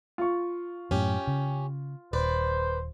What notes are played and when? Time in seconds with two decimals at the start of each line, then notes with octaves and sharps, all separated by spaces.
0.18 F4 C#6
0.91 F#2 A2 C#4 G4
1.27 C#3
2.13 D#1 B4 C5 D5